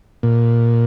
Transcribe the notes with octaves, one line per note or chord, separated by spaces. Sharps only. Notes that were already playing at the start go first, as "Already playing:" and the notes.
A#2